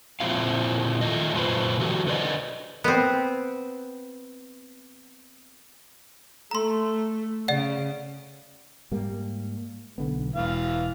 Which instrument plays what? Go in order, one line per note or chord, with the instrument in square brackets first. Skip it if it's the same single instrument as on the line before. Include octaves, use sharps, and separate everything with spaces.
[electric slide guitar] A#2 F3 B3 C4 E4 F5
D#3 A3 F4 D#5
F#2 A#2 F4 B4 C5
E3 F#3 A3 F#4 G4
D3 B4 D5 D#5
[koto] B3 C4
[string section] A3 [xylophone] A#5 C6
[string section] C#3 [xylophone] D5 F#5
[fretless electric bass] G#2 G3 A#3
B1 D3 B3
[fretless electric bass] E1 [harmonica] E3 F5